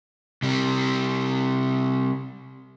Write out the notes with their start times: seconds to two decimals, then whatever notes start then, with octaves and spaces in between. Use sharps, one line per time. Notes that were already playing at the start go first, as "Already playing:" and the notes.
0.43 C3 G3